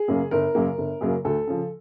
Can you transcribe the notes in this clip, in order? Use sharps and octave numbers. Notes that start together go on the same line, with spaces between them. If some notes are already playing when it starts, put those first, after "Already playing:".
Already playing: G#4
F#2 C#3 F#3 A#3
G1 A#4
F#2 C#3 F#3 A#3
G1
F#2 C#3 F#3 A#3
D2 A4
C#3 F3